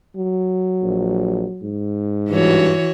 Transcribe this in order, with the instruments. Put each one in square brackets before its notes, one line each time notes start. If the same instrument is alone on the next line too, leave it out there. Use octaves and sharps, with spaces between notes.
[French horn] F#3
[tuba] A#1
G#2
[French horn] G2 [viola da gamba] E3 F#4 C#5